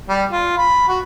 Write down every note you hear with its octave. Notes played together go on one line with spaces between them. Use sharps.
G3
F4
B5
F#4